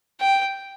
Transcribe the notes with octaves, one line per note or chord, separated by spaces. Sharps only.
G5